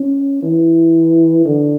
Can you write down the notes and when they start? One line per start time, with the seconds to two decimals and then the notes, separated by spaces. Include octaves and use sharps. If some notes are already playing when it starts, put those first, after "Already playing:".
Already playing: C#4
0.43 E3
1.46 D3